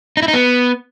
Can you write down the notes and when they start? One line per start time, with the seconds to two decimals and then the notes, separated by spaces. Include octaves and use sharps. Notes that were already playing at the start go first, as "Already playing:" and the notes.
0.17 D#4
0.23 E4
0.28 D#4
0.34 B3